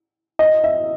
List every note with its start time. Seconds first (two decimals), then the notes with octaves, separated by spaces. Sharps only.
0.39 D#5
0.64 E5